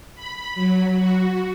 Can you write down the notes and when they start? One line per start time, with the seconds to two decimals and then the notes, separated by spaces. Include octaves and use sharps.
0.15 B5
0.55 F#3
0.97 F#4